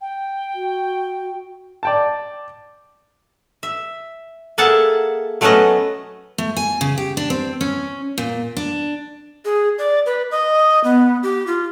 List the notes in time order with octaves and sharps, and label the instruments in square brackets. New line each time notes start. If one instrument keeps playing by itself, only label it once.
[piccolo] G5
[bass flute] F#4
[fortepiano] D5 G5 A5
[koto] E5
A#3 G#4 A4 E5 F#5 A5
F#3 A3 B3 C#4 B4 D#5
[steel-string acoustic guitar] A3
G#5
C#3
G4
D4
C4
C#4
A#2
D4
[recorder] G#4
D5
B4
D#5
B3
G4
F4